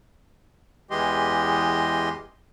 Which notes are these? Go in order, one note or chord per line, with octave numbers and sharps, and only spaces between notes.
E2 E3 G#3 G4 D#5 C6